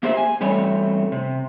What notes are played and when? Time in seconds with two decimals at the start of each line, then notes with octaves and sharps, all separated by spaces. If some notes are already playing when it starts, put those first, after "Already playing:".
0.03 A#3 G4 G#4 C5 E5
0.17 G#5
0.40 E2 G3 A3 C4 C#5
1.12 C3